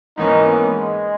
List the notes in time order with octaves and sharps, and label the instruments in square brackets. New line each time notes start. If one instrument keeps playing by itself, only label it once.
[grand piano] G#2 E3 A#3 C#4 [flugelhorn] D#4
[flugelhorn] B3
G#3